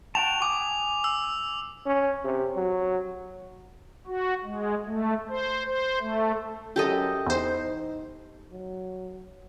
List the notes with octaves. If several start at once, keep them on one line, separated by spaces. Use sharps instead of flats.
F#4 G5 A5 F7
G#5 D6 D#6
E6
C#4
C3
F#3
F#4
G#3
A3
C5
C5
A3
F#2 G4 A4 D#5
E2 D#4 C5
F#3